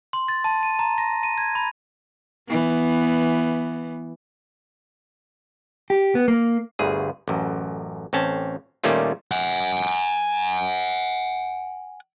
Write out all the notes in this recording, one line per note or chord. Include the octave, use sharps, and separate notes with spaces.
C6
A6
A5
D#7
A#5
A#6
D#7
G#6
B5
E3 B3
G4
B3
A#3
G1 D2 G#4
A1 F#2
A1 C4 C#4 A5
A#2 D#3 G3 A3 C#4 F4
F#5 G#5